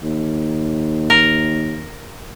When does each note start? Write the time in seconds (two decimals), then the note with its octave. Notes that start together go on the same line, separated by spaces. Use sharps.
0.03 D#2
1.10 A#4